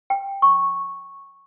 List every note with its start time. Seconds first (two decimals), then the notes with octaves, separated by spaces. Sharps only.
0.10 G5
0.42 C#6